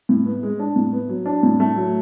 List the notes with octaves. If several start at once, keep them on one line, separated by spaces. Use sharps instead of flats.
A2
B3
G#3
D4
A2
B3
F#3
D4
A2
A3
F#3